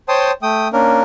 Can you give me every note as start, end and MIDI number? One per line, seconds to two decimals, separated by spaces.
0.08 0.31 72
0.08 0.31 73
0.08 0.31 79
0.08 0.31 81
0.08 0.31 84
0.08 0.31 87
0.42 0.68 57
0.42 0.68 79
0.42 0.68 87
0.73 1.03 58
0.73 1.03 61
0.73 1.03 62
0.73 1.03 70